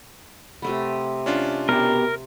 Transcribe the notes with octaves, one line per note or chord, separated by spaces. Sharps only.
C3 A3 B3
C#4 D4 F4
B2 G4 A#4